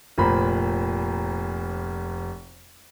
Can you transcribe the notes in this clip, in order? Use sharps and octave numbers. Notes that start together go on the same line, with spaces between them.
F1 A#2 C5 A#5 B5